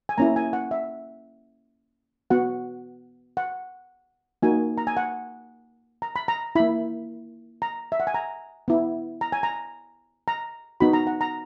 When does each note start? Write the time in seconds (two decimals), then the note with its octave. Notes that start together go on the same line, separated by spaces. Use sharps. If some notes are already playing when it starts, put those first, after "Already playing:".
0.09 G#5
0.18 A#3 C#4 E4 A#5
0.36 G#5
0.53 F#5
0.71 E5
2.30 B3 F#4 F#5
3.37 F#5
4.42 A#3 D#4 F#4 G#5
4.78 A#5
4.87 G#5
4.97 F#5
6.02 A#5
6.16 B5
6.28 A#5
6.55 A#3 E4 B5
7.62 A#5
7.92 E5
8.00 F#5
8.07 G#5
8.14 A#5
8.68 B3 E4
9.21 A#5
9.32 G#5
9.43 A#5
10.28 A#5
10.80 B3 D#4 F#4 B5
10.93 A#5
11.07 F#5
11.21 A#5